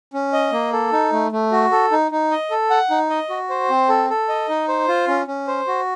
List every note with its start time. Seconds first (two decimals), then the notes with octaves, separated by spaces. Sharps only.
0.14 C#4
0.33 D#5
0.52 A#3
0.73 A4
0.92 D#4
1.12 A3
1.32 A3
1.52 F#4
1.72 A4
1.91 D#4
2.11 D#4
2.31 D#5
2.51 A4
2.70 F#5
2.90 D#4
3.10 D#5
3.30 F#4
3.50 C5
3.70 C4
3.89 A4
4.10 A4
4.29 D#5
4.49 D#4
4.68 C5
4.88 F4
5.08 C#4
5.27 C#4
5.48 C5
5.67 F#4